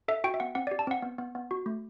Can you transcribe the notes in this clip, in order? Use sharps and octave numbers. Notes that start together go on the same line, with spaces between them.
A4 E5
F#4 G5
E5
B3 F#5
C4 F#5
G4 D5
A5
C4 F#5
B3
B3
B3
F#4
A3